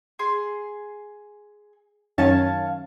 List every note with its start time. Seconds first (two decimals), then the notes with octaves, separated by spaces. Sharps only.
0.19 G#4 C6
2.18 F#2 D#3 C#4 C#5 F5 A5